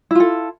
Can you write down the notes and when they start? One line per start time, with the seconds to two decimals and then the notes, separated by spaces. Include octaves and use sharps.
0.11 E4
0.15 F4
0.20 A4